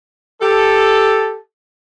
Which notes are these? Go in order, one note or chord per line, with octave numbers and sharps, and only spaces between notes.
G4 A4